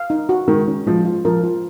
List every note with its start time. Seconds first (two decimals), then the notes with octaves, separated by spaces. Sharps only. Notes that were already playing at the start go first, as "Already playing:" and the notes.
Already playing: F5
0.10 D#4
0.29 F#4
0.48 D#3 G#3
0.67 C#4
0.87 F3 G#3
1.05 F4
1.25 F3 A#4
1.44 F4